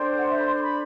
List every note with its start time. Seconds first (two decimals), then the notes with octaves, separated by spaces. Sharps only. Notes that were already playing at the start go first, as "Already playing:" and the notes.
Already playing: D4 A4 C5 G5
0.17 F#5
0.29 E5
0.40 B5
0.45 C6
0.55 C6
0.62 B5